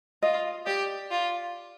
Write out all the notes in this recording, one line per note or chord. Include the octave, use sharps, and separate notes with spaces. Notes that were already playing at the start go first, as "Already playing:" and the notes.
F4 D#5
G4 D5
F4